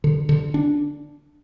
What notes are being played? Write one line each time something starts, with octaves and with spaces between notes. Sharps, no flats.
D3
D3
D4